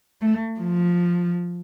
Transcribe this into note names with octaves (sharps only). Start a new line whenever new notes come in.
A3
F3